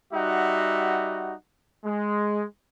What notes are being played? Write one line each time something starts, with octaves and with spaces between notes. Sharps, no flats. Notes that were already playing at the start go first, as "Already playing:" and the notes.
G3 D#4 F#4 E5 F#5
G#3